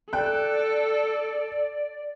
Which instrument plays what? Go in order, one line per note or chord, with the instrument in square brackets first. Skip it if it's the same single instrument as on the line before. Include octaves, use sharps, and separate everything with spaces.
[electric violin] A4 [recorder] D5 [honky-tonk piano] G5 F#6